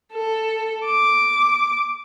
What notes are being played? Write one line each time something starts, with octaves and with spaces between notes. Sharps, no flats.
A4
D6